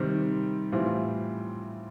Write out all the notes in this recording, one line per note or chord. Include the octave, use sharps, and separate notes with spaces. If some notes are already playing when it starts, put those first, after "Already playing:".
Already playing: C3 D#3 G3 C4
A2 E3 G3 C4 F4